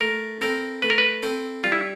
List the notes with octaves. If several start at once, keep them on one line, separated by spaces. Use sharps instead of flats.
A3 A#4
C4 E4 A4 A#4 C5
A3 B4
A#4
B4
C4 E4 A4 C5
G3 F4
E4